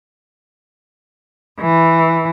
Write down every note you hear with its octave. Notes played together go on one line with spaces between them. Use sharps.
E3